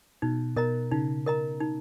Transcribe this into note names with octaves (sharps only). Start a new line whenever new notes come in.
B2 D#4
B2 A#4 D#5 A#5
C#3 D#4
A#4 D#5 A#5
D#4